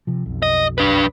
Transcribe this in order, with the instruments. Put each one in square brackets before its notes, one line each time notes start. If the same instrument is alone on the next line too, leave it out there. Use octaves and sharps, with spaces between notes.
[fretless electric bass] C3 F3
B1 F2
[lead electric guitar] D#5
D4 B4